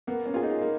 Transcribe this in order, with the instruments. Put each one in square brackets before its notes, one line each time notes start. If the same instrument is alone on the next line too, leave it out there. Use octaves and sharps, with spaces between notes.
[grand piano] A#3 [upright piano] B3
[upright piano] C#4
[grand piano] F4 G#4
[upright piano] D#4
[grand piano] A#3